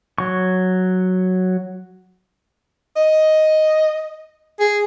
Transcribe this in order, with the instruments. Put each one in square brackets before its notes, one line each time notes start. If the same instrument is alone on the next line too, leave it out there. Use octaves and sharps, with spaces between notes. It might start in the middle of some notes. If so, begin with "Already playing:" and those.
[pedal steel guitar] F#3 C#6
[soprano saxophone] D#5
G#4